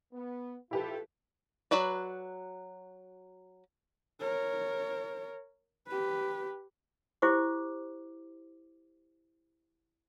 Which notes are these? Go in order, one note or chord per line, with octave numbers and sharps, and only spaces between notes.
B3
A3 E4 F4 G4 A4 B4
F#3 F#4 B4 D5
A#4 C#5
G4 B4
E4 G4 C5 D6